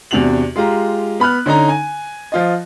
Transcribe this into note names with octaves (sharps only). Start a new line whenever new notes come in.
E2 C3 D4 F#4 F7 F#7
G#3 F4 G4 A#5
B3 B5 F6 F#6
D3 C#4 D#4 A#5
G#5
F3 F4 D#5